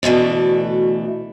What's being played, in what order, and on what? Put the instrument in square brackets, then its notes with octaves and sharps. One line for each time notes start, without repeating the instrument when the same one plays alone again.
[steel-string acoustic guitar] D2 B2 E3 A3 D4